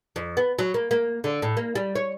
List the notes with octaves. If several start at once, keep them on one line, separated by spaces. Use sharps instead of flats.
F2
B3
F#3
A#3
A#3
D3
A2
A#3
G3
C#5